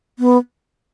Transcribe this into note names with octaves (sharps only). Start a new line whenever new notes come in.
B3